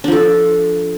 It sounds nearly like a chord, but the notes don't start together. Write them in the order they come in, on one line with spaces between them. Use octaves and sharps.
D4 F3 A4